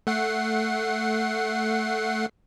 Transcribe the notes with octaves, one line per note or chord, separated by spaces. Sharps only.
A3 F#5 C7